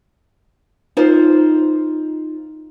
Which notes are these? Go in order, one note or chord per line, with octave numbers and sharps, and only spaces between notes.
D#4 F4 C5